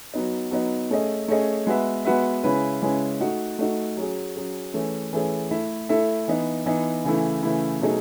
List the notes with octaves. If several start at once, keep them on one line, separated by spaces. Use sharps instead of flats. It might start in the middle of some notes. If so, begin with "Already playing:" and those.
F#3 B3 D#4
F#3 B3 D#4
A3 C#4 G#4 D#5
A3 C#4 G#4 D#5
G#3 B3 F#4 B4 E5
G#3 B3 F#4 B4 E5
C#3 G#3 C#4 E4 B4
C#3 G#3 C#4 E4 B4
A3 D#4 F#4
A3 D#4 F#4
F#3 C#4 G#4
F#3 C#4 G#4
E3 A3 C#4 G#4
E3 A3 C#4 G#4
A3 E4 A4 E5
A3 E4 A4 E5
E3 B3 D#4
E3 B3 D#4
C#3 E3 A3 E4
C#3 E3 A3 E4
B2 F#3 A3 D#4 G#4